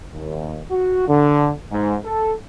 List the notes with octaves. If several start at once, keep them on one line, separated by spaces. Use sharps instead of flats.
D#2
F#4
D3
G#2
A4